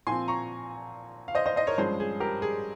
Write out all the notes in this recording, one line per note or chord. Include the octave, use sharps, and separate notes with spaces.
A#2 F3 C4 G#5 C6
A#5 C#6
F5
C5 D#5
C5 D#5
C5 D#5
A#4 C#5
G2 F3 G#3 C#4 G#4 C5
G#4
G4 A#4
G#4